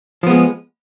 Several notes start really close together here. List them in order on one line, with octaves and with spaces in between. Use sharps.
F3 B3 G#3